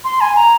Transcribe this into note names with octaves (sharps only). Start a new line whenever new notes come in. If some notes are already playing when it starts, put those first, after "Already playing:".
C6
G#5
A#5